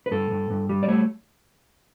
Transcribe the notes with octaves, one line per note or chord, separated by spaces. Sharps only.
B4
G2 A4
G2
G2
G3
D5
A3 C#5